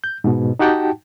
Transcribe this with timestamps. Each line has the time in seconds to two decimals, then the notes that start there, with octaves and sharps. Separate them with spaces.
0.04 G6
0.24 G#2 B2
0.59 D#4 F#4 G4 F#5 G5 A5